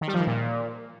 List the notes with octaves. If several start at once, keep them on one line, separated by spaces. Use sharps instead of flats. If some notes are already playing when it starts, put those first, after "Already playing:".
D#3
G3
F3
D#3
A#2